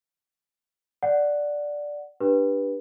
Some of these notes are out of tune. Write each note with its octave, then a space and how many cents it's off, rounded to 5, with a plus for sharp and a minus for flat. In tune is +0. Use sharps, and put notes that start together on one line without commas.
D5 +0 F#5 +0
D4 +0 G4 +0 B4 -15